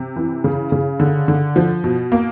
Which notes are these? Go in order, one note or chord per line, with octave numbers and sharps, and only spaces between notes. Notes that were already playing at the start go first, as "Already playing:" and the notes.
Already playing: C3
E3
C#3
C#3
D3
D3
F3
B2
A#3